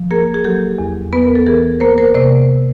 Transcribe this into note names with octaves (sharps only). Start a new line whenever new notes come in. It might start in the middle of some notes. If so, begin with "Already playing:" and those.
Already playing: F3
A#3 G#4 A#4
G#4
F#3 G4 A4
E2
B3 B4
A#4
A4
E3 G#4 A#4
A#3 A#4 C5
A#4 C5
C3 C5 D5